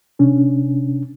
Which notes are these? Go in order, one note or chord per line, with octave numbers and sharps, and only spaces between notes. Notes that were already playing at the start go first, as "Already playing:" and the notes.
C3 C#4 D4